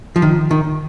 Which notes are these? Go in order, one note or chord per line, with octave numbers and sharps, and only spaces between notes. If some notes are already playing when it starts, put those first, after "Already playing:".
F3
D#3
D#3